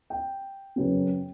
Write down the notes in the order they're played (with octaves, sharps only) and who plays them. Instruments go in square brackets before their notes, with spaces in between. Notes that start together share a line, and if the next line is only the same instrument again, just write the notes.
[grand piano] G5
F#2 C#3 F#3 B3